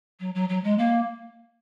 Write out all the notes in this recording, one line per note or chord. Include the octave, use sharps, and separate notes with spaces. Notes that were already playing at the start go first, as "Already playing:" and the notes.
F#3
F#3
F#3
G#3
A#3